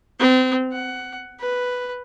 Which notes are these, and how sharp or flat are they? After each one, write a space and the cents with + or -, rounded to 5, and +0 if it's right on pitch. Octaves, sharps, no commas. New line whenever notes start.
C4 -30
F#5 +15
B4 +0